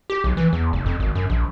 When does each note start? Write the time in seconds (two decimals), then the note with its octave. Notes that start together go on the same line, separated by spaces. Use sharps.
0.10 G4
0.24 B1
0.37 E3
0.53 E2
0.73 F1
0.86 F2
1.00 G#1
1.15 F#2
1.30 A#1